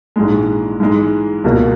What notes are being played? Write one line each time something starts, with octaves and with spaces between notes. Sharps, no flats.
A#1 G#2 E3 G#3
G#2 E3 G#3
C#2 B2 A#3